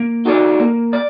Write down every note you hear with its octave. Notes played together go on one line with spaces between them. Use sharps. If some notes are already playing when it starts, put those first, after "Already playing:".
Already playing: A#3
D#4 F#4 A4 D5
A#3
D5